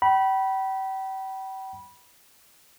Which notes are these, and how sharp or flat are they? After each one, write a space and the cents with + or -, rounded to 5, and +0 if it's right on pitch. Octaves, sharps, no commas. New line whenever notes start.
G5 -40 B5 -15